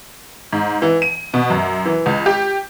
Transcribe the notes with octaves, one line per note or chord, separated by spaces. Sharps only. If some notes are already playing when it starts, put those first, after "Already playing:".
G#2
E3
D#7
B2
F#2
E3
C#2
G4